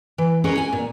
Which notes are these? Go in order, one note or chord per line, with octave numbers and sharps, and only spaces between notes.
E3
C#4 G#4 A#4 B4 C#5
G#5
A#2